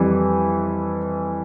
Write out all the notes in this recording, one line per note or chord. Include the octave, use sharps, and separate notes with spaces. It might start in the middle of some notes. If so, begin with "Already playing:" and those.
Already playing: F2 E3 G3